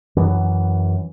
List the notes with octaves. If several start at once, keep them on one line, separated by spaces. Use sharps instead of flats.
F#2 E3 F#3